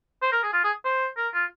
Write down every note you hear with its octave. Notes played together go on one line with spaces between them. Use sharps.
C5
A#4
G#4
F4
G#4
C5
A#4
F4